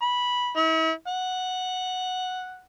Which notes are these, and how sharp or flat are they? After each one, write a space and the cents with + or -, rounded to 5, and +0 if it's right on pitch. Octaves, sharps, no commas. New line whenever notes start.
B5 -10
E4 -40
F#5 -5